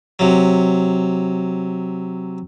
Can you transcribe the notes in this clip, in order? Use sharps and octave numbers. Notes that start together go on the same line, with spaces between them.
C3 F#3